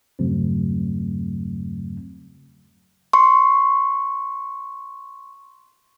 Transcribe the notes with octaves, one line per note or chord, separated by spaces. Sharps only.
E2 G2 C#3 F#3 A3 C4
C6 C#6